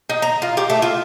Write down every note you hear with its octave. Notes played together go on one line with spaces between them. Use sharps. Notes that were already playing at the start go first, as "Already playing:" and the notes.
D#4
A#5
F4
G4
A3
F4